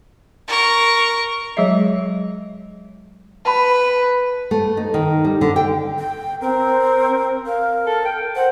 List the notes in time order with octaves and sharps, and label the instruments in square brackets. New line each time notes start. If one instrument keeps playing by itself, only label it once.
[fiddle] A#4 C#6
[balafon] F#3 G#3 G#4 D#5 E5
[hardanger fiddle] B4 [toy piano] A5 B5
[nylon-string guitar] A3
D#4
D#3
G3
D3
G5
[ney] G5
[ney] C4 [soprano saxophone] A#4
[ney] A#4 [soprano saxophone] F5
[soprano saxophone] A4
G5
[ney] C5 [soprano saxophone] F#5